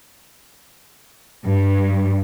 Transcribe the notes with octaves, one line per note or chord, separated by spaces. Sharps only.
G2